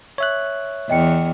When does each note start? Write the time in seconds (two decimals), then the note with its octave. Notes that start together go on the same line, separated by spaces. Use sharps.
0.18 C#5 E5 F#6
0.89 E2 D#5 G5 C#7